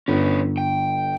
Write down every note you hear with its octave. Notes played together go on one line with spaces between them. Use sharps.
G1 C#4 B4
G5